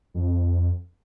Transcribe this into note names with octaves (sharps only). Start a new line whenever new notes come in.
F2